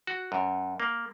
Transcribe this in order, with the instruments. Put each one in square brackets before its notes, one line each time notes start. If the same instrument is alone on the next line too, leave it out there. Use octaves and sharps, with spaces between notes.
[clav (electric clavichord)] F#4
F#2
A#3